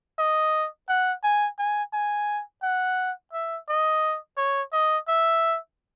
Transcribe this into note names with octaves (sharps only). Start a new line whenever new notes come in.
D#5
F#5
G#5
G#5
G#5
F#5
E5
D#5
C#5
D#5
E5